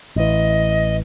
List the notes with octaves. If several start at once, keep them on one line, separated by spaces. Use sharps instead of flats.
A1 E3 D#5